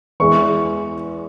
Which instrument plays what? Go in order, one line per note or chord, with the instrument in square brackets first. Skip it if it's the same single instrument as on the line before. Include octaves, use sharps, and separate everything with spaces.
[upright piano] E2 E3 G#3 C#6